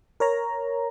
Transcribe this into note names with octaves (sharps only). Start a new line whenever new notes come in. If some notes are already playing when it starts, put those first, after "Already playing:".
A#4 C#5 A#5